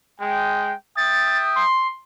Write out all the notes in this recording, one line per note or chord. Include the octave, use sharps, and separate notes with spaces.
G#3 G5
E5 G5 D#6 A6
C6